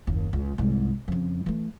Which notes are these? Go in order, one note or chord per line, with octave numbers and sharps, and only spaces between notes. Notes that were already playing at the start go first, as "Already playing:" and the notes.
F#1 D#2
C#2
C2 G#2
F2 C#3
E3 A3